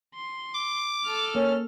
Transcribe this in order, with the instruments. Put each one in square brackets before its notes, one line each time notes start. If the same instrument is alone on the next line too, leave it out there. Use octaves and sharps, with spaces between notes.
[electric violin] C6
[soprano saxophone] D6
[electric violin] A4 F6
[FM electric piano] A#3 [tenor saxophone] C#4